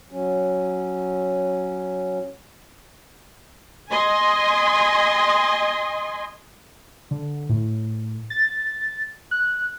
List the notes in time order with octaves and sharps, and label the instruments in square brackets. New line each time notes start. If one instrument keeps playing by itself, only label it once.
[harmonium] F#3 C#4
[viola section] D#5 G#5 C6
[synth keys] D3
A2
A6
F#6